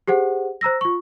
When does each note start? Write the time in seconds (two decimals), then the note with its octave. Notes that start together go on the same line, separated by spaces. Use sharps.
0.08 G4 G#4 C5 F#5
0.61 C5 A#5 E6 A#6
0.81 F4 C#6